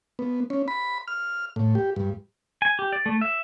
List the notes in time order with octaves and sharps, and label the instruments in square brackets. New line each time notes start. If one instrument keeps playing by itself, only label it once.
[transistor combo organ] B3
C#4
B5
F6
A2
G4
G2
[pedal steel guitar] G#5
G4
D5
A3
E5